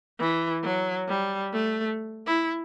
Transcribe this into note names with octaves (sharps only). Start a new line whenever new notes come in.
E3
F#3
G3
A3
E4